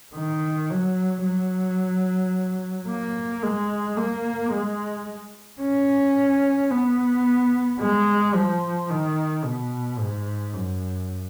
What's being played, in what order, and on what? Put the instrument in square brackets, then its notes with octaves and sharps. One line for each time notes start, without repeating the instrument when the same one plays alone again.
[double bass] D#3
F#3
F#3
A#3
G#3
A#3
G#3
C#4
B3
G#3
F3
D#3
B2
G#2
F#2